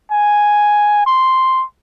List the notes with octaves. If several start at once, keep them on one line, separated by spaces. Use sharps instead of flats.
G#5
C6